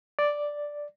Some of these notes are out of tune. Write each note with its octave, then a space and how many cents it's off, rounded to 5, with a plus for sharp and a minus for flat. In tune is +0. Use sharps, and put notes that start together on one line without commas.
D5 +0